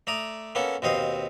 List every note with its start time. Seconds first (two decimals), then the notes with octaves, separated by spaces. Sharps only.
0.07 A3 D5 A#5 D#6
0.55 A#3 B3 C#4 A4
0.82 D#2 B2 C4 D#5 F5 D#6